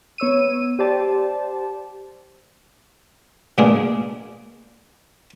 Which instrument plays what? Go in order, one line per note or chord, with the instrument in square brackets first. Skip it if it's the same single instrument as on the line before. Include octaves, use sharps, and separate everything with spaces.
[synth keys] B3 C#5 E6 D#7
G4 C5 D5 A5
[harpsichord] B2 G#3 A#3 D4 G#4